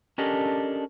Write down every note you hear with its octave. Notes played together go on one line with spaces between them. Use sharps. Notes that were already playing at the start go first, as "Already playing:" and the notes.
C#4 D4 G4 A4 A#4 D#5